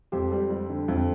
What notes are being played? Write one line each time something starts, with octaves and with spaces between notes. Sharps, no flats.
F2 G4 C5
G3
G3
D3
F2